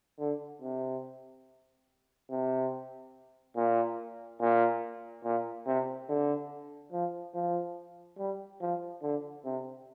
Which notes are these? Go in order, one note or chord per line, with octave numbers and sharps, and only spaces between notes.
D3
C3
C3
A#2
A#2
A#2
C3
D3
F3
F3
G3
F3
D3
C3